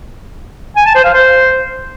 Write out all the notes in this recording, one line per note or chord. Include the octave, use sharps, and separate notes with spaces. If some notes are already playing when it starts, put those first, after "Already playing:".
G#5
A5
C5
F5
C5